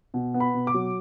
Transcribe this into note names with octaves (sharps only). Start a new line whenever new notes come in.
B2
B3
B5
B2
D6
F#3